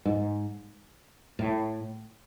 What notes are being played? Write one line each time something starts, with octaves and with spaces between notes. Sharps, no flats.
G#2
A2